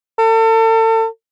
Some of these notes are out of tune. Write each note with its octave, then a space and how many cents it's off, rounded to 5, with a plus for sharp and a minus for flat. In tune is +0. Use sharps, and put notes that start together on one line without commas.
A4 +35